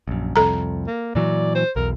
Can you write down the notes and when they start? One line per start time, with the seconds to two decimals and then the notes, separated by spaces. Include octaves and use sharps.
0.08 A#1 F#2
0.36 C2 F2 A4 A#5
0.87 A#3
1.15 A#2 E3 F#3 D5
1.55 C5
1.76 B1 E2 A#4